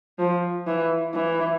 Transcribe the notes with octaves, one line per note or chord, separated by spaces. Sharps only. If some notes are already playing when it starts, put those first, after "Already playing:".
F3
E3
E3